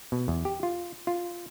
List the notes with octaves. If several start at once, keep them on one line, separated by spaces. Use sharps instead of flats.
B2
E2
G4
F4
F4